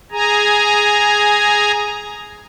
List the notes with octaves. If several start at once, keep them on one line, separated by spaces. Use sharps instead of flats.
G#4 G#5 A#5